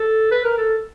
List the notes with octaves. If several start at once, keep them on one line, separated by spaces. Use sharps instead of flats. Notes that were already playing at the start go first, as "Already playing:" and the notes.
Already playing: A4
B4
A#4
A4